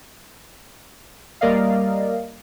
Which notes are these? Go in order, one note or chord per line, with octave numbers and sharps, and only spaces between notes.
G3 A#3 A#4 D5 D#5 F5